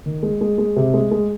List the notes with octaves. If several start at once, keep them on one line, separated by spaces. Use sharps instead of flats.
D#3
G#3
G#3
G#3
C3
G#3
G#3